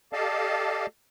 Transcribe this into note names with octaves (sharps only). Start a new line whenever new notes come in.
G4 A4 D5 D#5 F5 A5